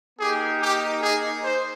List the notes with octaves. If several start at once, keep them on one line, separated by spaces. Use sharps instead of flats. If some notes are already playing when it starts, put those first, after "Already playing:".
A#3 D#4 G4 G#4
G4
G#4
C5